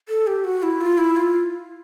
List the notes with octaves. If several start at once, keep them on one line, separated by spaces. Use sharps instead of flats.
A4
G4
F#4
E4
F4
E4
F4